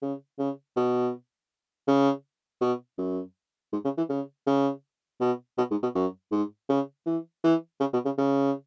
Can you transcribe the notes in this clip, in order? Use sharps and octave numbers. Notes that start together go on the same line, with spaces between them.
C#3
C#3
B2
C#3
B2
F#2
G#2
C#3
E3
C#3
C#3
B2
B2
G#2
B2
F#2
G#2
C#3
E3
E3
C#3
B2
C#3
C#3